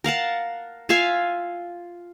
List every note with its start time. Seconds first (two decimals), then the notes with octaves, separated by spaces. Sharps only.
0.04 A#4 F5 F#5 A5
0.89 F4 E5 F5 G#5